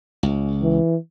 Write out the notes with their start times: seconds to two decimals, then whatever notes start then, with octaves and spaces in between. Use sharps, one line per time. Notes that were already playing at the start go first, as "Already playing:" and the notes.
0.23 C#2
0.62 E3